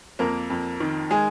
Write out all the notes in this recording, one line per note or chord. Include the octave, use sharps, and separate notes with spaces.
F2 A#3 A#4
F2
D#3
G#3 G#4